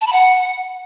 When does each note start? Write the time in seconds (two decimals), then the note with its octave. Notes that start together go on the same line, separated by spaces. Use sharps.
0.01 A5
0.07 B5
0.13 F#5